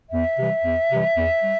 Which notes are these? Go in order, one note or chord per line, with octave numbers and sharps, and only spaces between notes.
E2 E5
C3 E3 G3
E2
C3 E3 G3
E2
G3